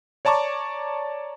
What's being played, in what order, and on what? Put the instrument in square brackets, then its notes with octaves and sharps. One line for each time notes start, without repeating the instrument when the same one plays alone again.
[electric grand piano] C#5 D5 A5 A#5 C#6 D6